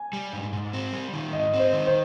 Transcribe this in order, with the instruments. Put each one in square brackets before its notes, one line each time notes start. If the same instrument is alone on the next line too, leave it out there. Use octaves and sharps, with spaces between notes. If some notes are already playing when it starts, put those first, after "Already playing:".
Already playing: [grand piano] G#5
[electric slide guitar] G3
G#2
G#2
C4
G3
D#3
[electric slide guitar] G#2 [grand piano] D#5
[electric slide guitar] C4
[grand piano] C5
[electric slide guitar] D#3
[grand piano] C5